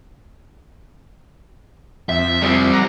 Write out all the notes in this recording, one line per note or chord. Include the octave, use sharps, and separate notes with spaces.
F2 E5
G3 C4
F#5 A#5